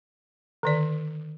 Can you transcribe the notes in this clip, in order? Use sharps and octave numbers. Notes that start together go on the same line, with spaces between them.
D3 D#3 D5